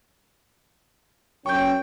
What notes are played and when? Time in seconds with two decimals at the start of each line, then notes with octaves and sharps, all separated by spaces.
1.46 F#2 C#4 C#5 G5 C#6 G6